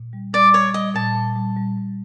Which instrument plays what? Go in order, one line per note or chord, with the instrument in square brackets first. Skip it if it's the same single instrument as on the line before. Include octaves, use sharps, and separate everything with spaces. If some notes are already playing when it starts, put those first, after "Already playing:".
Already playing: [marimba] A#2
G3
[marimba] G3 [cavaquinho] D5
[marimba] G3 [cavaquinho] C#5
[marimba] G3 [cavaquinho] D#5
[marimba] A#2 [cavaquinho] A5
[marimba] A#2
G3
G3
A#2